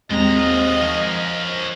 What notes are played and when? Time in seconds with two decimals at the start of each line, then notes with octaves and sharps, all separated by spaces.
0.10 D#2 B2 G#3 C4 D#5 A#5
0.36 F4 F#4
0.81 F3 A#4 C#5